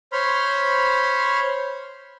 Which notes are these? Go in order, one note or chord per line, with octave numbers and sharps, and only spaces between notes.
C5 C#5 B5 C6 F6